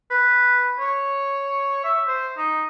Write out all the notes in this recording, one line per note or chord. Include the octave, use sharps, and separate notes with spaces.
B4
C#5
E5
C5
D#4